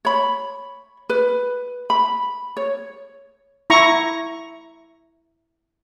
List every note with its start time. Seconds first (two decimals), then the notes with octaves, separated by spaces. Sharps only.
0.05 C#5 B5
1.09 B4
1.90 B5
2.57 C#5
3.70 E4 A#5 C#6